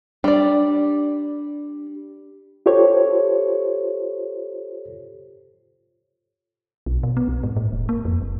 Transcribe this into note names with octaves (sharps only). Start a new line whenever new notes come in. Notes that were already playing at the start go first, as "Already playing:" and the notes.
G3 D4 D5
F4 G4 A4 C5 C#5
B1
B2
B3
C2
G#2
A2
E1
A#3
F2
F#1